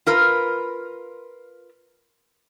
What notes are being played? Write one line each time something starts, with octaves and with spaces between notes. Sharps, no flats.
F4 A#4 B4